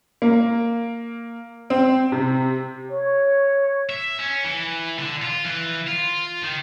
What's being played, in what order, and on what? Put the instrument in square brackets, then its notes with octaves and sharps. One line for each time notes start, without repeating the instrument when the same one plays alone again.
[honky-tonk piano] A#3
C4
C3
[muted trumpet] C#5
[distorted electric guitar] E5
C#4
E3
D3
F4
E3
F4
D#3